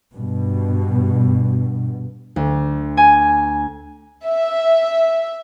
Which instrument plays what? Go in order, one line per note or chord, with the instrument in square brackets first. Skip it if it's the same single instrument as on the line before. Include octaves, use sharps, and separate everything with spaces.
[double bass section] G2 B2
[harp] D2
G#5
[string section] E5